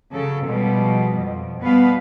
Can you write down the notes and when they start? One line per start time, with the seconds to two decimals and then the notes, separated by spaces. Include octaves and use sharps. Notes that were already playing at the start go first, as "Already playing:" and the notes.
0.12 C#3 F#3 A4
0.46 B2 F3 G3 G#3
1.18 F2
1.62 B2 G3 B3 B4 F5